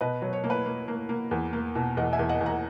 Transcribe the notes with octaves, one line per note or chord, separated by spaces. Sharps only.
B2 B4 D#5
F#3
C#5
A#3
B4
A#3
A#3
A#3
E2
A#3
B2
E2 D#5 F#5
E5 G#5
E2
D#5 F#5
E2
F#5 A#5